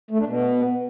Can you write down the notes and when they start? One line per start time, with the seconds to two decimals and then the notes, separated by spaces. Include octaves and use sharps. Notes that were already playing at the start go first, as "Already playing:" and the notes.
0.11 A3
0.18 D4
0.26 B2